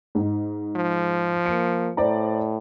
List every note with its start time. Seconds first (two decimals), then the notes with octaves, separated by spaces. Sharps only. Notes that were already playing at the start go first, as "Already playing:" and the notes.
0.15 G#2 D#4
0.76 F3
1.46 A#3 C#7
1.97 A2 C5 D5 A#5